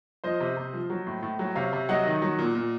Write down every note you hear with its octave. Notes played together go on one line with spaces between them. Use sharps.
F3 C5 D#5
C3
C3
F3
F#3
A2
A2
F#3
C3 C#5 F5
C3
F#3 D#5 F#5
D#3
F#3
A#2
A#2